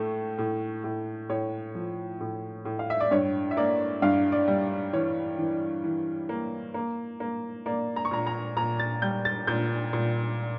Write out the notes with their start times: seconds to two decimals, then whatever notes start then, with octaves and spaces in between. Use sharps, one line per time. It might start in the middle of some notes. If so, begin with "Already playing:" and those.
Already playing: A2 A3
0.38 A2
0.84 A2
1.29 A2 C#5
1.75 F3
2.21 A2
2.65 A2
2.79 F5
2.90 E5
3.00 D5
3.11 G2 C#5
3.51 E5
3.57 A#3 D5
4.02 G2 F5
4.32 D5
4.48 G3
4.93 E3 C#5
5.38 E3
5.84 E3
6.29 A#3
6.74 A#3
7.20 A#3
7.66 A#3 D5
7.96 A#5
8.05 C#6
8.11 A#2 A#5
8.27 A#5
8.56 A#2 A#5
8.79 A6
9.02 G3 G6
9.25 A6
9.47 A#2 G6
9.93 A#2